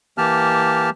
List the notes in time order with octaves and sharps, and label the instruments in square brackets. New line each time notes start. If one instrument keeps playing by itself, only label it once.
[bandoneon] E3 A#3 G4 A5 F6